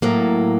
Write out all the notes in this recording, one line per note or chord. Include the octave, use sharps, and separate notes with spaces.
A2 F#3 A#3